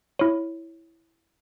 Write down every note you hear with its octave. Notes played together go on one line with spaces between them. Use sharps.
E4 C#5